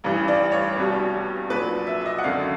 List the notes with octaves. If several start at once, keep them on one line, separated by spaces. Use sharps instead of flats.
A1 G2 E3
D5
C#5
F1 E2 B2 G3
A#1 A#2 F#3 B4
E5
E5
D#5
F#5
G#1 F#2 D3 F#3 F5